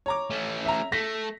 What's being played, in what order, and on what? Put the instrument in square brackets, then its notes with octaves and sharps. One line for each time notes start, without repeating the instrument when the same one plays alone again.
[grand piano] C#5 A#5 D6
[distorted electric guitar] A3 C#4
[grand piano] E5 A#5
[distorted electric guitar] A3 [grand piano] A#6 B6